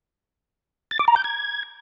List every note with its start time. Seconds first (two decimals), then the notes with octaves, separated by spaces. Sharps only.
0.91 A6
0.99 D6
1.08 A#5
1.16 G6
1.24 G#6